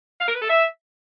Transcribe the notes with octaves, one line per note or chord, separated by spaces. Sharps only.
F5
A#4
B4
A4
E5